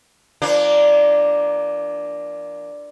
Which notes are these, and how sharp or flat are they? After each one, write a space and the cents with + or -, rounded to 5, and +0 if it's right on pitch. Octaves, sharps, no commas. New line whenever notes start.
F3 -40 A#3 +0 D4 +0